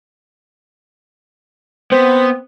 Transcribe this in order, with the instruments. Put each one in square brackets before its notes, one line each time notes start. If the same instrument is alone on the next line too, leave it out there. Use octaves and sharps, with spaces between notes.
[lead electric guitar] B3 [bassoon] C4 [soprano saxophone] C5